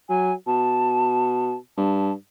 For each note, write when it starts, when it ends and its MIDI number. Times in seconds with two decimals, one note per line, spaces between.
0.09 0.33 54
0.09 0.33 80
0.47 1.56 47
0.47 1.54 81
1.77 2.12 43
1.77 2.12 81